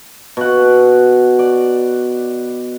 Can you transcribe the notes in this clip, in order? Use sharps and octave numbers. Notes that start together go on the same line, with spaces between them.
B2 F#5
D5